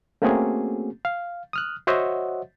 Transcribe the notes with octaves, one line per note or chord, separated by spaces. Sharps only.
A3 A#3 C4 C#4 F#4 G#4
F5
D#6 F6 F#6
F#4 C5 C#5 D#5 E5 F#5